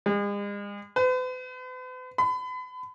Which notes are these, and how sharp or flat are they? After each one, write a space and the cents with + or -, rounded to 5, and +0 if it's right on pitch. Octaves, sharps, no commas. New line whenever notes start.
G#3 -40
B4 +45
B5 +35